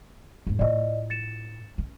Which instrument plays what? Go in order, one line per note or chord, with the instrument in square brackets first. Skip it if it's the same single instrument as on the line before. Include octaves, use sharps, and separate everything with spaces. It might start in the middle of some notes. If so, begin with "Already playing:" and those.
[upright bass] E2 G#2
[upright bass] A2 F4 [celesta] D5 D#5
[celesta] A6 C#7 E7
[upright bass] C#4